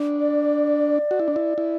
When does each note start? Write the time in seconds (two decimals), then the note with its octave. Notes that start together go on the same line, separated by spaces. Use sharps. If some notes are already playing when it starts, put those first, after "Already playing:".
Already playing: D4
0.18 D5
1.11 F#4
1.20 E4
1.28 D4
1.36 E4
1.58 E4